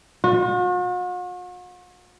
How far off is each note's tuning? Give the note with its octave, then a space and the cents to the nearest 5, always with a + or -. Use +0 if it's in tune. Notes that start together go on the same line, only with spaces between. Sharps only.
F#4 -45